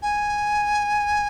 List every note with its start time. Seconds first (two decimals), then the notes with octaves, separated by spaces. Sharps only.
0.02 G#5